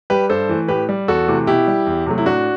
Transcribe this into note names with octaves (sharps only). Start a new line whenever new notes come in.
G3 G4 B4
G2 A4 C5
E3 A3
A2 G4 B4
G3
E2 F#4 A4
C3 E3 A3
B2 E4 G4
G3
E2
C3 F#3 A3
E4
A2 D4 F#4